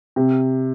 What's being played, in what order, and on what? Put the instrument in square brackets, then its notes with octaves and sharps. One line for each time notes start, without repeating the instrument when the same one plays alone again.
[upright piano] C3